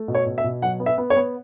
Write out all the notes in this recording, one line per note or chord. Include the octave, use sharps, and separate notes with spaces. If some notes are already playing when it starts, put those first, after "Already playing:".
Already playing: A3
B2
C#5
B2
E5
B2
F#3 F#5
B3
E5
B3
C#5
B3